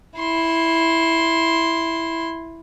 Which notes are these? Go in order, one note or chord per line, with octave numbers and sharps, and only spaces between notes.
E4 C6